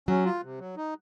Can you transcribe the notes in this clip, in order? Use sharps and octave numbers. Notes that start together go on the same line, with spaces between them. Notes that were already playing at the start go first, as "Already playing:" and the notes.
F#3 C#4
F4
C3
F#3
D#4